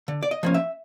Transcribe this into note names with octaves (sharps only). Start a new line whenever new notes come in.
D3
D5
D#5
F3 A#3 C#4
E5